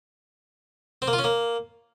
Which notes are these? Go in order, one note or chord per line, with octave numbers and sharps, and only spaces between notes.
C4
A#3
F4
C#4
A#3